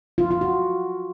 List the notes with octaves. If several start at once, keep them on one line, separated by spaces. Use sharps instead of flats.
F4
F4
F#4